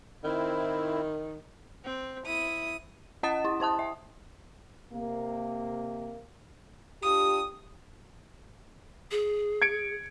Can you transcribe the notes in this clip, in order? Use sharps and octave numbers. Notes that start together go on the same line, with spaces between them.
D#3 C4 E4
C4
E4 D#6
C#4 D#5 F#5 D#6 A6 E7
E4
E4 C5 A5 D#6
E5
C3 A#3
D4 F4 G4 D#6
G#4
G#6 C#7 D7